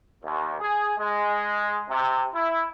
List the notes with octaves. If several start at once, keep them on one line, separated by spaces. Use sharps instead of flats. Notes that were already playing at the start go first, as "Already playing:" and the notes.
D#2
G#4
G#3
C3
E4